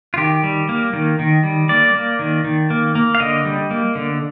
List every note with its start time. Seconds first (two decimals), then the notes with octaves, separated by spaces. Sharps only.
0.14 F4
0.17 D#3 G4
0.43 G3
0.69 A#3
0.93 D#3
1.19 D#3
1.44 G3
1.69 A#3 D5
1.95 A#3
2.19 D#3
2.45 D#3
2.70 A#3
2.95 A#3
3.15 F5
3.20 D3 D#5
3.45 G3
3.71 A#3
3.95 D3